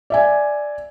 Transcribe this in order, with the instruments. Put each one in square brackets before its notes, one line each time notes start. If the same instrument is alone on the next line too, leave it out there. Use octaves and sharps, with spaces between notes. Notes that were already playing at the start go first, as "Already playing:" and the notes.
[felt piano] D5 E5 G#5